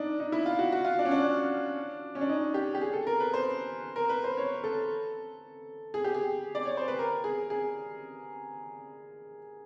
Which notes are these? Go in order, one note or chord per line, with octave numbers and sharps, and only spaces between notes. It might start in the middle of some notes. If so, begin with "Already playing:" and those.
Already playing: D4 D#4
D#4
E4
F4
F#4
F#4
F4
D4
C#4
D4
C#4
D4
D#4
G4
G4
G#4
A4
A#4
B4
C5
A#4
B4
C5
C#5
A4
G#4
G4
G#4
D5
C#5
C5
B4
A#4
G#4
G#4